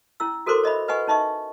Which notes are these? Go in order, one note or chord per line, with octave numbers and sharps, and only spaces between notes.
C#4 E4 E6
F#4 A4 A#4 C5 C6 D6
C#5 D#5 E5 B5
B4 D#5 F#5 G#5 C#6
C#4 D#4 D#5 E5 C#6